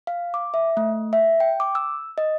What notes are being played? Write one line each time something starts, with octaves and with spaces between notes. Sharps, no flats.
F5
D6
E5
A3
E5
G5
D6
E6
D#5